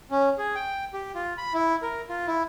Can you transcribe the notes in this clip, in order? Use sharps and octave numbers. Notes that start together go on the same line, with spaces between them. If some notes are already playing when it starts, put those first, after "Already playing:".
C#4
G#4
G5
G4
F4
B5
E4
A#4
F4
E4